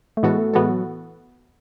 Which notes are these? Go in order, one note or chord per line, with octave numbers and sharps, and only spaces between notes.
A3
A2 E3 G#3 B3 F#4 A4
A3
A2 E3 G#3 B3 F#4 A4
F#3